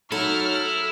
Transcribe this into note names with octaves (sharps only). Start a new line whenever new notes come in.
F#3 D#4 E4 A4 F6